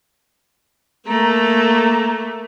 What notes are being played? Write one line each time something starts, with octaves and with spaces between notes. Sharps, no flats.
A3 A#3 A#5